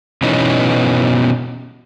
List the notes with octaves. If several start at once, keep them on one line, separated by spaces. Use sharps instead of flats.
B2 E3 B3 C#4 D#4